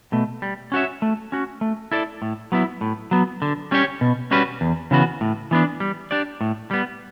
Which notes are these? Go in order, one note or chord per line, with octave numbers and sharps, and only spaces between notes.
B2 A3
G3
C#4 F#4 C#5 E5
A3
C#4 F#4
A3
E4 A4 D5
A2
F#3 B3 E4
A2
F#3 B3
D3
G3 C#4 G4 C#5
B2
G3 C#4 F#4 B4
E2
C#3 E3 B3 F#4
A2
E3 B3 D4
G3
D4 G4 D5
A2
G3 B3